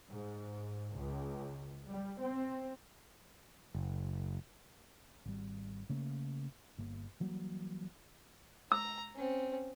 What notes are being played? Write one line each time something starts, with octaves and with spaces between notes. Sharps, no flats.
G#2
C#2
G3
C4
F#1
G#1 G3
C#3 A3 A#3
G1 A#3
E3 F#3 G3 A#3
A#5 E6
C4 C#4